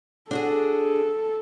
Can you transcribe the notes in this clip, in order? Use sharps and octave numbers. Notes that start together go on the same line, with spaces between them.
D4 F#4 G#4 A4